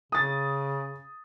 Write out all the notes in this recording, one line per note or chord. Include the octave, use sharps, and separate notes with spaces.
C#3 D#6 A6